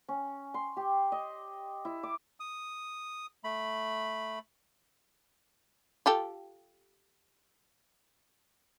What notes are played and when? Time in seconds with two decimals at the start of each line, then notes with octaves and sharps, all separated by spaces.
0.08 C#4
0.54 C6
0.77 G4
1.12 D#5
1.85 E4
2.03 D6
2.40 D#6
3.44 A3 B5
6.06 F4 G4 A4